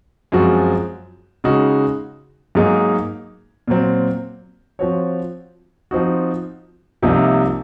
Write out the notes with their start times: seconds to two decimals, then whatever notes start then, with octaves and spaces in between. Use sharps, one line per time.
0.32 F#2 F3 G#3 C4 F#4
1.44 C#3 G#3 D#4 F#4
2.55 G#2 F#3 A#3 D#4 G#4
3.68 A#2 F#3 C4
4.79 F3 C4 F#4 C#5
5.91 F3 C4 D#4 F#4
7.03 C2 C3 F3 A#3 D#4